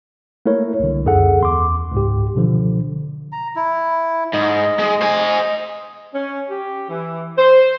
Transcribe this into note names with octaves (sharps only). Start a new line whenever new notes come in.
A3 A#3 E4 A#4 C#5
C2 D3
C#2 F#2 G#4 A4 F#5
E2 C6 D6
C#2 G#2 G4
B2 D3 F3
A#5
E4
G#2 D#5
G#3
C5 G#5
C#4
G4
E3
C5